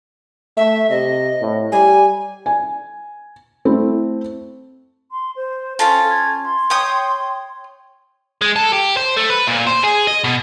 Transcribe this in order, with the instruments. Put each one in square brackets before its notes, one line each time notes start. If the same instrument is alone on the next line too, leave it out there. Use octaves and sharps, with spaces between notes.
[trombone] A3 [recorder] E5
[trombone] C3 [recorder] D#5
[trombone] A2
[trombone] G3 [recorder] G#5
[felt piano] G#5
A3 C4 E4
[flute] C6
C5
[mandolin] C#4 F4 A5 [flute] A4
[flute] G#6
C6
[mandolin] C#5 G5 D#6
[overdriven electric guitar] G#3
A4
G4
C5
A3
B4
A#2
C5
G#4
D#5
B2